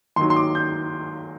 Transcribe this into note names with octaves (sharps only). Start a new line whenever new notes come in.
D#2 D#3 F#3 C6
C6
D6
G6